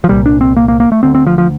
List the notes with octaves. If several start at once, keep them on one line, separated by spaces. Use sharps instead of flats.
F3
C2 A#2 G3
D4
C4
A#3
A#3
A#3
A3
D2 D3 C4
C4
F3
F3